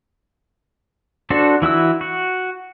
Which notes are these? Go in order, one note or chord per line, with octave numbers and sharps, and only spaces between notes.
D4 F#4 A4 C5
E3 E4 F#4 E6
F#4